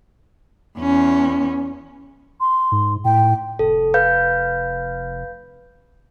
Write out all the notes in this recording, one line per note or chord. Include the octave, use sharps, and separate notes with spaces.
E2 C#4
C6
G#2
A2 G5
F1 A4
B4 F5 G6